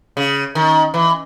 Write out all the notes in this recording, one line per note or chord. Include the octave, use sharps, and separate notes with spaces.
C#3
D#3
E3